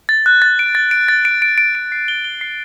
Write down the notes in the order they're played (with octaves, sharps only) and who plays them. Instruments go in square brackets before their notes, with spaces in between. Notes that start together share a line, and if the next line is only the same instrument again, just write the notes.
[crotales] A6
F#6
A6
D7
A6
D7
A6
D7
D7
D7
D7
C7
G7
G7
C7